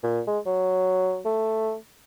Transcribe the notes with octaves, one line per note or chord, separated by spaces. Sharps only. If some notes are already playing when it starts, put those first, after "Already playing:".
A#2
G#3
F#3
A3